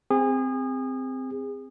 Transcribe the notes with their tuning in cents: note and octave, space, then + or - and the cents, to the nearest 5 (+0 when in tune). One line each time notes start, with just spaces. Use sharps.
C4 -10 G#4 -30